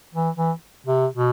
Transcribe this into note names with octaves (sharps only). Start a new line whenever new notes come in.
E3
E3
C3
B2